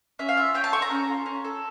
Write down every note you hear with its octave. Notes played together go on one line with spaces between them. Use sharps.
C#4 E5
F5
F4 E5
C#4 G5
A5
A4 C#6
A#5
C#4
F4
C#4
A4